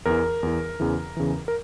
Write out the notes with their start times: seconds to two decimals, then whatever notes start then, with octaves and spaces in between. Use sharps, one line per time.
0.06 E2 E3 A#4
0.43 E2 E3
0.80 E2 C#3 E3
1.17 E2 C#3 E3
1.48 A#4